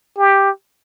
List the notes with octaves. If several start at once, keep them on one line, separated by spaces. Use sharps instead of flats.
G4